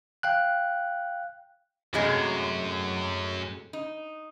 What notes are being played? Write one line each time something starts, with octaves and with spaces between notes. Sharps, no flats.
F5 G5 F#6
F#2 A2 C3 G#3
D#4